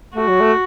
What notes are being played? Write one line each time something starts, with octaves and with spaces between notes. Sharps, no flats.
A3 F#4
F#3
A3